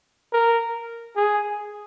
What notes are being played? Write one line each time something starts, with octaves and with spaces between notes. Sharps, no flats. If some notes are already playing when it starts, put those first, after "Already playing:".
A#4
G#4